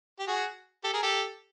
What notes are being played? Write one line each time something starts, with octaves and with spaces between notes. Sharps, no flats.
G4
F#4 G#4
G4 A4
G#4 A#4
G4 A4